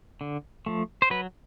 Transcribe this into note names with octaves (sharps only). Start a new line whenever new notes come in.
D3
F3 A3
C5
F#3 B4